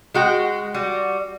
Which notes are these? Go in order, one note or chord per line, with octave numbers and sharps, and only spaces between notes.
G#3 F#4 G5
G3 F#4